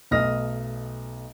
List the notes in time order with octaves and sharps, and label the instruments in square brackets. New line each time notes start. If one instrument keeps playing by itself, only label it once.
[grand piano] B1 A3 D#5 D#6 F6 A#6